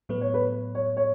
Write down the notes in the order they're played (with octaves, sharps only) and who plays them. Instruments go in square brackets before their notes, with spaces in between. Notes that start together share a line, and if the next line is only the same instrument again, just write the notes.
[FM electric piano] A2 F#3 B3 [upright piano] B4
[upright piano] C#5
B4
C#5
C#5